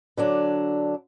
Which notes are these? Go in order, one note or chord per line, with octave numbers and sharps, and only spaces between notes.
D3 F#3 D4